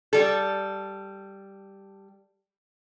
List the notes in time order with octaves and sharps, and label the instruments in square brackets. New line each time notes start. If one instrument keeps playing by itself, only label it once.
[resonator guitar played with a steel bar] G3 A4